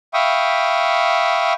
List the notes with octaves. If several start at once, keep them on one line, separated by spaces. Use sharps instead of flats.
E5 F5 G5 B5 C#6 D#6